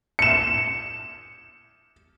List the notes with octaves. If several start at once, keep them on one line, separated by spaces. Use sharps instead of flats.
C#7 E7